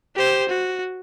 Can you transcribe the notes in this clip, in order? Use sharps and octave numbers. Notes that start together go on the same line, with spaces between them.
G4 C5
F#4